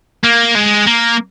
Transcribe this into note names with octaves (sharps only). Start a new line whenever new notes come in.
A#3
G#3
A#3